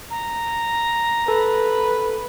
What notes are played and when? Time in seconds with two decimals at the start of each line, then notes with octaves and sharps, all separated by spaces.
0.10 A#5
1.28 A4 B4